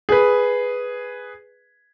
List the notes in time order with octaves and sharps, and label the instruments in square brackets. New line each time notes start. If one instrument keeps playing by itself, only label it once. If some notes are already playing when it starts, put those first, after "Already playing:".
[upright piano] G#4 B4